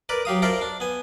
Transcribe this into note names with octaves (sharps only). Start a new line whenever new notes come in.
A#4 B4 D5
F#3 G4 F5 D#6
F4 A4 A#4 C5 D5 E5
D4
B3 G#5